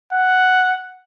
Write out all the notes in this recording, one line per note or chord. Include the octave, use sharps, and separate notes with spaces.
F#5